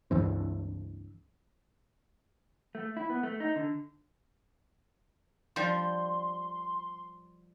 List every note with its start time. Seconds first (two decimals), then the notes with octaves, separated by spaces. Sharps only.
0.11 C#2 G2 E3 C4
2.75 A3
2.97 E4
3.10 B3
3.23 A3
3.40 D#4
3.56 D3
5.56 F3 G3 C5 C6